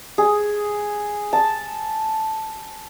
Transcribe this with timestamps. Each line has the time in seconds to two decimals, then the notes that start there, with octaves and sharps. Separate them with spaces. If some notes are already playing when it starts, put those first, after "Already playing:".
0.18 G#4
1.33 A5